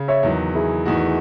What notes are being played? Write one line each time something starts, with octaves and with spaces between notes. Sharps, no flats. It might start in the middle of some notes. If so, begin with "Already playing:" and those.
Already playing: C#3
C#5 E5
E2 D#3 F#3
E4 G#4
E2 D#3 A3 D#4 F#4